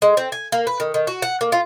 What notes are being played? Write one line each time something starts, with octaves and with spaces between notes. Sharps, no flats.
G#3
C4
G#5
A#3
B4
D#3
D#3
F#4
F#5
A#3
F4